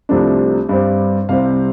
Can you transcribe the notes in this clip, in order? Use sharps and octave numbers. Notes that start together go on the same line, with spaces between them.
C2 C3 F3 A3 D4
G2 G3 C4
C2 C3 G3 C4 F5